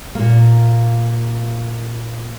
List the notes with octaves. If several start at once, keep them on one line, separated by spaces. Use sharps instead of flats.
A#2 A#3